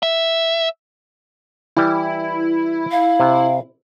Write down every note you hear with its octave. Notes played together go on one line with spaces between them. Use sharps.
E5
E3 G3 E4
F5
C3